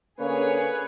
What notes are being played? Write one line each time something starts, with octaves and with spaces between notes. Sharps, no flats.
D3 A#3 C#4 G#4 B4 C#5